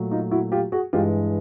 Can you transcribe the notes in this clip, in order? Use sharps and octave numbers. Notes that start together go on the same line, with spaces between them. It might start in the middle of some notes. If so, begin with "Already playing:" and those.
Already playing: A#2 F#3 A3
D#4 F4
E4 F#4
F4 G4
F#4 G#4
G2 E3 G#3 F4 G4